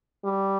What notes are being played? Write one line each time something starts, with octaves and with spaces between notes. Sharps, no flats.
G3